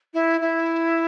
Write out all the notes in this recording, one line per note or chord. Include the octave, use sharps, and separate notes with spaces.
E4
E4